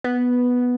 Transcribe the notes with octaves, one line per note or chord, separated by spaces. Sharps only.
B3